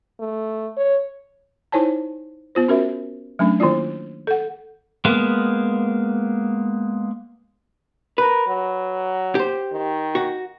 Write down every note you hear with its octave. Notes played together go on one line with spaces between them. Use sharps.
A3
C#5
D#4 E4 C5 C#5 G#5 A5
B3 F4 C5
C#4 F#4 A#4 E5
F#3 A3 C#4 D4
D#3 A#3 E4 F4 D5
A4 F#5
G#3 A#3 B3
A#4 B4
F#3
G4 C5
D#3
F#4